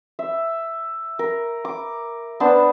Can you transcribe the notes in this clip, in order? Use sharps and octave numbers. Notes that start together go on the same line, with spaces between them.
E5
A#4
D6
B3 D4 C5 A5